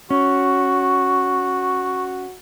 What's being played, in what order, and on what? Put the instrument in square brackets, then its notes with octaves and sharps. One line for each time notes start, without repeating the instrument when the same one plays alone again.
[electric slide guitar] C#4 [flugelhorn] F#4 [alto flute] C#6